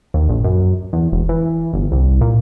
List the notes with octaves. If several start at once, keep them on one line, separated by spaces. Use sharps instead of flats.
D#2
A#1
F#2
E2
E1
E3
G1
C2
A#2